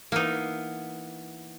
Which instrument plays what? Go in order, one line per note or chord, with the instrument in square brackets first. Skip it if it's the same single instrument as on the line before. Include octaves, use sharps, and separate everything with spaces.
[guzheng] E3 B3 [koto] A#3 D#4